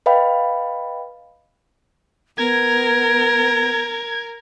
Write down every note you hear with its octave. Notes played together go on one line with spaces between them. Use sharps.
B4 D#5 F5 G5 B5
B3 A#4 G#6